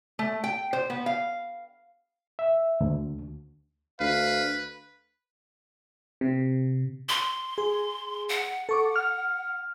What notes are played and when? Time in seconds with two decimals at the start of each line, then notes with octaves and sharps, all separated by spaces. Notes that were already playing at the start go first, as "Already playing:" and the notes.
0.19 A3
0.44 G5
0.73 C5
0.90 B3
1.06 F5
2.39 E5
2.81 D2
4.00 D2 B4 F5
6.21 C3
7.09 C6
7.58 G#4
8.29 F#5
8.69 A4 C#6 D6
8.96 F6